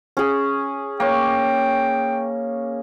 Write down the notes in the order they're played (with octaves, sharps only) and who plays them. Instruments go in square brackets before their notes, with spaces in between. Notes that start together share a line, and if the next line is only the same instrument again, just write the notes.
[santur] C#4 G#4
[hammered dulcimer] A#3 C#5 [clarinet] G5